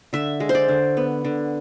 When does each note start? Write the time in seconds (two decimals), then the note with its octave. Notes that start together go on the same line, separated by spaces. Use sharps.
0.13 D3 E5
0.40 G#3
0.49 C5
0.55 D5
0.68 D3
0.97 B3
1.25 D3